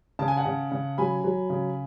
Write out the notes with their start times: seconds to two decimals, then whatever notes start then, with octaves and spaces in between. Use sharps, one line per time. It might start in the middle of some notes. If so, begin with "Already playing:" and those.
0.19 C#3 A5
0.28 G#5
0.36 F#5 A5
0.45 C#3
0.72 C#3
0.98 F#3 G#5 B5
1.24 F#3
1.50 C#3